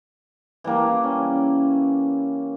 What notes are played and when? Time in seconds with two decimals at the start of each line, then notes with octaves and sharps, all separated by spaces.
0.64 E3 G3 A#3 D4
1.04 C#4